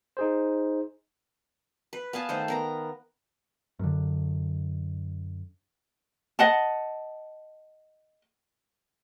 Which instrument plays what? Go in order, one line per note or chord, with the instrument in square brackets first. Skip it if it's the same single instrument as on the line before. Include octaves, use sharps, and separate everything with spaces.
[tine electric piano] D#4 G#4 C5
[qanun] B4
B3 F5 G#5 A5
D#3 A3 C5
B3 A#4 A#5
[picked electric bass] F#2 D3
[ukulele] D#5 F#5 A5